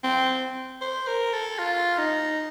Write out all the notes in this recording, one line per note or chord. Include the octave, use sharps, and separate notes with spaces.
C4
C5
A#4
A4
F4
D#4